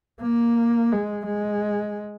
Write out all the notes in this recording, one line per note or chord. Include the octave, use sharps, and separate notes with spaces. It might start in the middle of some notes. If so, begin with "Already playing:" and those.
A#3
G#3
G#3